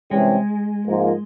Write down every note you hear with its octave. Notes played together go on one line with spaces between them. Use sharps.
C3 E3 G3 G#3 C#4 G4
G#2 F3 A#3 F4 A#4